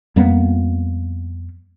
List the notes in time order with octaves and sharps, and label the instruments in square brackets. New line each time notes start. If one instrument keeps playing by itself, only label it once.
[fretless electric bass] F2 G3 A#3 B3